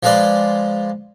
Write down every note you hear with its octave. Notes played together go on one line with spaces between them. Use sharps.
F3 G#3 F4 B4 D5